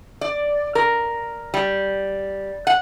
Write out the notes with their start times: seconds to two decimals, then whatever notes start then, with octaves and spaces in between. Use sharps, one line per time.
0.21 D5
0.75 A#4
1.54 G3
2.67 F#5